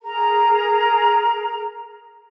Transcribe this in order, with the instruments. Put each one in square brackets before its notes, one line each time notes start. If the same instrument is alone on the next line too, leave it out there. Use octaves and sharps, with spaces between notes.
[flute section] G#4 A#4 A#5